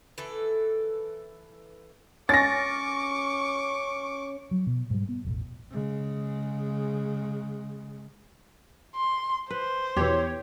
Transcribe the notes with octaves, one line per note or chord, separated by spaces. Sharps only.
E3 A4
C#4 C#6 D6 A6 A#6
F#3
B2
G#2 G3
B3
E1 A1
C#3 G#3
C6
B4 C5
E2 B2 E3 G4 C#5